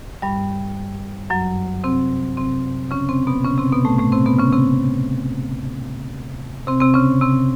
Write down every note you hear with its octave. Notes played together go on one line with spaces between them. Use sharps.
G2 G3
F#2 F#3
C3 C4
C3 C4
C#3 C#4
C3 C4
B2 B3
C#3 C#4
C3 C4
B2 B3
A2 A3
A2 A3
C3 C4
B2 B3
C#3 C#4
C3 C4
C3 C4
C3 C4
C#3 C#4
C3 C4